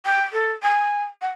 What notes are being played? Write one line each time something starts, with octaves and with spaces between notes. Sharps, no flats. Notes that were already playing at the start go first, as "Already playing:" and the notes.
G5
A4
G#5
F#5